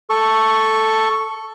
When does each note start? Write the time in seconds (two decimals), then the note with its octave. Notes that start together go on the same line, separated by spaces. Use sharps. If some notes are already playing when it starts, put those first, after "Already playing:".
0.10 A4 C#6